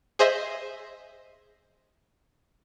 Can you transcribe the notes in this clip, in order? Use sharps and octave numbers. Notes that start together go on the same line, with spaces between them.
G#4 C5 D#5 E5